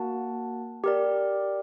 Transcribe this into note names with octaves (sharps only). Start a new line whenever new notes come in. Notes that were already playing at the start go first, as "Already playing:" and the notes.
Already playing: A#3 F#4 A#4 F#5 A5
G4 A#4 D5